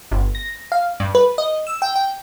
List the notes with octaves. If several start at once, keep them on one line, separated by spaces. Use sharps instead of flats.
G1
A#6
F5
G2
B4
D#5
E6
G5
G5